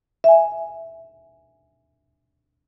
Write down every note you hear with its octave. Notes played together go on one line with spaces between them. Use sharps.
E5 G#5